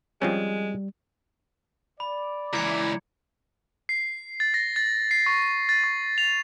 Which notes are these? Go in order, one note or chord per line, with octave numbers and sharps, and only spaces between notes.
F3 G3 G#3 C4 C#4
D5 B5
C#2 E3 E4 A#5 G#6 C#7
C7
A6
A#6
A6
C7
C#6
A6
C#6
F7